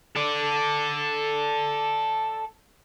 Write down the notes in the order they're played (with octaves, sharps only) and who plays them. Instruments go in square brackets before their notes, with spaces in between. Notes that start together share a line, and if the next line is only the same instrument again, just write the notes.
[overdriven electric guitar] A4 D5